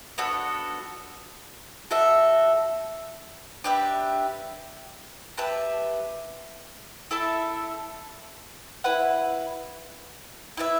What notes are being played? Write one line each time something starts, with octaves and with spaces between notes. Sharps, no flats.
B3 D4 F#4 A4
F#4 A4 E5
D4 G4 B4 E5
G4 B4 E5 A5
E4 A4 E5 A5
E4 B4 F#5
E4 B4 E5